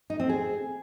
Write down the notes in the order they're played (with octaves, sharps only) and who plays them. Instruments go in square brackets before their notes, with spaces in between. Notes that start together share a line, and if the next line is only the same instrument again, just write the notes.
[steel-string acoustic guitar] D#4
C4
G#4